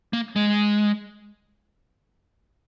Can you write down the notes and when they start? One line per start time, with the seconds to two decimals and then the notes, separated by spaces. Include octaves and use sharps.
0.13 A#3
0.36 G#3